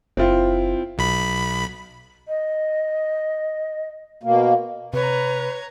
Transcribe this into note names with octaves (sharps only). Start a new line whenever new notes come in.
F#1 C4 E4 F4
B1 B5
D#5
B2 A#3
C3 B4 C#5 A#5